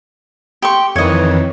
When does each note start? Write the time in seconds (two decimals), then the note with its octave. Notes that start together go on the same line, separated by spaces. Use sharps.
0.62 G4 C6 C#6
0.96 F2 D#3 E3 C#5 D#5